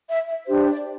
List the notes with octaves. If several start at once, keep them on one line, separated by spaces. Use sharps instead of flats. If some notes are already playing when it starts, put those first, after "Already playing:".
E5
E5
D4 G4 C5
D5